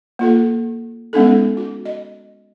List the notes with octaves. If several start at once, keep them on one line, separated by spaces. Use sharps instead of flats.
A#3 F4 A4
G#3 B3 C#4 D#4 A4
F#4
D#5